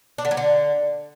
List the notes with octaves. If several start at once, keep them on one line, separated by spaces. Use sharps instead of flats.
D4
D3
F#3
D3